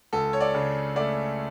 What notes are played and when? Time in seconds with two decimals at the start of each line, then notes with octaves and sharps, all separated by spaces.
0.13 C#2 A4
0.33 C#5
0.40 D5
0.54 C#3
0.96 A3 D5